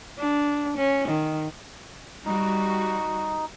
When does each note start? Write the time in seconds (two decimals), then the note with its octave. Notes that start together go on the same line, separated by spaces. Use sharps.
0.18 D4
0.77 C#4
1.08 D#3
2.25 G3 D#4 F#4